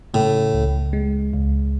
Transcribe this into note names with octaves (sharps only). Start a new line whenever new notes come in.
A2 C#3
C#2
G#3
C#2